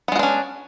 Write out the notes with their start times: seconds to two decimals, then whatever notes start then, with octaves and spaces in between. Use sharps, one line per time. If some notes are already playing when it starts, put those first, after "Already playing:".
0.08 B3
0.12 G#3
0.16 F#4
0.19 D4
0.23 C#4